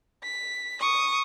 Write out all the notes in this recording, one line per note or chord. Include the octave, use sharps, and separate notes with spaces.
B6
C#6 D#6